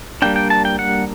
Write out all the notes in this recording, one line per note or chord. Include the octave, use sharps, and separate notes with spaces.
G3 A#3 D4 G5
G5
A5
G5
F#5